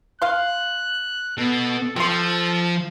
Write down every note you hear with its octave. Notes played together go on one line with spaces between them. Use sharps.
F5 C6 F#6
B2 A4
F3 C4 A4 C6